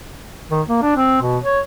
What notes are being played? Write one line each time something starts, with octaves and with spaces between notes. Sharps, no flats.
D#3
A#3
D4
C4
B2
C#5